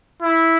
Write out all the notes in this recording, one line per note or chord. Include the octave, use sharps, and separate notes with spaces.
E4